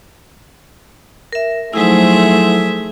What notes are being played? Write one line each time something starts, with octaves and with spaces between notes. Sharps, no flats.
A#4 E5
F3 F#3 A3 D#4 E4 G#4 C5 E5